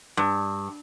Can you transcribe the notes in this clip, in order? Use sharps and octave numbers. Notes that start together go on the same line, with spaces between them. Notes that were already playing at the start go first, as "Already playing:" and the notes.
G2